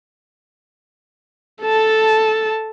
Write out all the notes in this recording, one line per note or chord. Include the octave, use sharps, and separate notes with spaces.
A4 A5